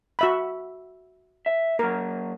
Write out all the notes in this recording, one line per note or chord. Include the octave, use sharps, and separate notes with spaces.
F#4 E5 B5
E5
F#3 A#3 A#4